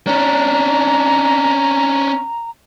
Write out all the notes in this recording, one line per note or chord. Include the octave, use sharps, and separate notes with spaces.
C#4 D4 A#5